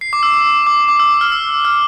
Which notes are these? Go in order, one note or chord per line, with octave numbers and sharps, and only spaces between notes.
C7
D6
E6
D6
D6
D6
E6
F6
E6
F6